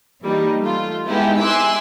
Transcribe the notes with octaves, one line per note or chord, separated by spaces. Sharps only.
E3 G3 A#3 D#4
A3 F4
G#3 B3 D#4 E4 G4 G#4
E5 G#5 C6 D6 E6 F#6